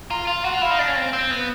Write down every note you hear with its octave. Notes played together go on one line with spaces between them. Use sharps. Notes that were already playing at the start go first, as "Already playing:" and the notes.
F4 A#5
F4 F5
F#4 F#5
F4
E4 F5
D#4
D4
C#4
C4
C4
B3